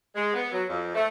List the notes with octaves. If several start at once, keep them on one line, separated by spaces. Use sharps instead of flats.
G#3
B3
F#3
F2
A3